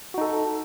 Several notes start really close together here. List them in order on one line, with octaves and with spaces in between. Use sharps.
F#4 D#4 A4